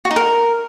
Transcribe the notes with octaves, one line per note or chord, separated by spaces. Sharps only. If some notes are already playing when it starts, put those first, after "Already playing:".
F#4
D#4
A#4